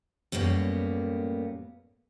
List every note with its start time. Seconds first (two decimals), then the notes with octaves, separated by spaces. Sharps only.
0.32 F#2 A2 G3 A#3 B3